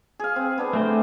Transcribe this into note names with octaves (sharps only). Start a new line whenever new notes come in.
G#4 F5
C4
B3 D4 G#4
A3 C4 C5